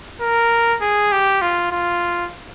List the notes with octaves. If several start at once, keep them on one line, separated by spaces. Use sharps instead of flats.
A#4
G#4
G4
F4
F4